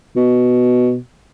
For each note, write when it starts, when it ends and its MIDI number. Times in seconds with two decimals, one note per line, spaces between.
0.16 0.97 47